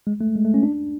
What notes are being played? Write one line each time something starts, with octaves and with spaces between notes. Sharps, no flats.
G#3
A3
G#3
A3
C#4
D4